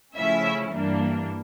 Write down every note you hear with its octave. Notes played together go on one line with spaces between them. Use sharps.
C#3 F3 A3 C#4 E4 E5
G2 E3 G3 A#3 D4